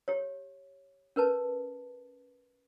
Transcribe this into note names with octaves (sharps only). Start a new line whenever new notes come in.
G4 C#5
C#4 A#4 B4 A5